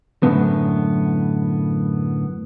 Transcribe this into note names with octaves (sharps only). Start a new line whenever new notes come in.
F#2 A2 D3 B3